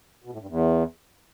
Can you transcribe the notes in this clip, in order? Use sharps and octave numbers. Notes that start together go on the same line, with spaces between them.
B2
A2
G2
E2